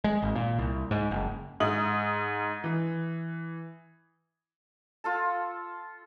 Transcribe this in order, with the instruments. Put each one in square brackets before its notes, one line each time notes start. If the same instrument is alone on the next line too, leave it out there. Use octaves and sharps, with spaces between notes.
[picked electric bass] G#3
G#1
A#2
C2
G#2
F#1
[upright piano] G#2 D#6 F#7
E3
[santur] F4 A4 A5